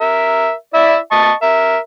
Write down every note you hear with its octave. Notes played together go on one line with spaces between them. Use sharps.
A#4 E5
E4 D5 E5
D#5 A5 C#6
A#4 E5